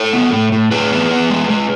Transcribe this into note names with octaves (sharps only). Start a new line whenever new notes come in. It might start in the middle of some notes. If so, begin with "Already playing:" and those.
Already playing: A4 C#5
B3
A2
A2
A2 G#4 B4
B3
B3
G#3
G#3